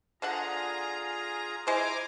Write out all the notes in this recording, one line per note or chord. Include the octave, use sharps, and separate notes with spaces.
D3 D4 F4 G#4 F#5 A#5
G#3 E4 C5 G#5 A#5 D6